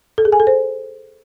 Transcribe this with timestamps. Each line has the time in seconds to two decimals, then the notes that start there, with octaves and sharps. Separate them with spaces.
0.18 A4
0.25 G#4
0.32 G#5
0.40 A4
0.47 C5